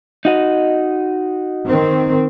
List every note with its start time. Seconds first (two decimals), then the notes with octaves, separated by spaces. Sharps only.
0.25 D#4 F#4 D#5
1.66 D#3 C4